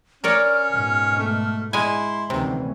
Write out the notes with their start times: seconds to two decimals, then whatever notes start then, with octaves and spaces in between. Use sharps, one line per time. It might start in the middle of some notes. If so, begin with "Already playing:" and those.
0.24 C#4 A#4 C#5 D5 F6
0.71 G#2 B2
1.19 A3
1.73 G#3 E4 G#5 C6
2.30 D2 C3 D#3 E3 C#4